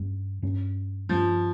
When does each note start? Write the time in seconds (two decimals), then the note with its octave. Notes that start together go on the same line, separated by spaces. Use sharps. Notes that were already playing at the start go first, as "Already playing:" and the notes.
Already playing: G2 G3 C#4
0.42 G2 G3 C#4
1.09 G2 F3 G3 C#4